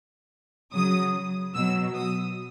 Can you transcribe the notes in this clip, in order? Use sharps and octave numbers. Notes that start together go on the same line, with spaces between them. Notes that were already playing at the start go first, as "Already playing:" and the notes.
C#3 F#3 D#6
B2 F#3 E6
D#6